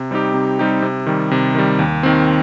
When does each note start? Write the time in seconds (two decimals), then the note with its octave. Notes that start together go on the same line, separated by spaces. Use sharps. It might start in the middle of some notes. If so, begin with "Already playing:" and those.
Already playing: C3
0.11 G3 C4 D#4 G4
0.34 C3
0.59 G3 C4 D#4 G4
0.82 C3
1.06 D#3 G3
1.31 C3
1.55 D#3 G3
1.79 D#2
2.03 D#3 C4